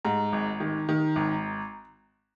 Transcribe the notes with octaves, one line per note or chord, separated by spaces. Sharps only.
G#2 A#5
G#1
D#3
D#3
G#1